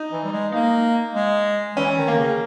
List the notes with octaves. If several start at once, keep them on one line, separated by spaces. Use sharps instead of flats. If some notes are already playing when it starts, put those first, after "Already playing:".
Already playing: D#4
E3
G3
G#3
A#3 D#4
G#3
E3 C#4
D#3
D#3 A#3
C#3